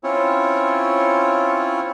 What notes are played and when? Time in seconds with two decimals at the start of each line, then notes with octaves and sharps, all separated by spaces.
0.04 C4 C#4 E4 F4 C#5